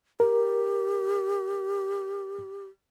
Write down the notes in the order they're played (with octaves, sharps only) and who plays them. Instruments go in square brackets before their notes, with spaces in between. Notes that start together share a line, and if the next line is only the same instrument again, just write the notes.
[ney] G4 [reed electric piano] A#4